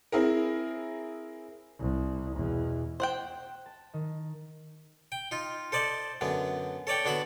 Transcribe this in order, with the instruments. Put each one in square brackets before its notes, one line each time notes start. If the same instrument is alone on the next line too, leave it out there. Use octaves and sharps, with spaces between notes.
[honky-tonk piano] C4 E4 G#4 A#4
[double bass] C2
E2 B2
[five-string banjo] C5 F#5 G5
[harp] A5
D#3
[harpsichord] G5
D#4 F4
A4 C5 D5 D#5
F#2 D3 B3
A4 C#5 D5 G5
D3 B3 D4 F#4 E5 B5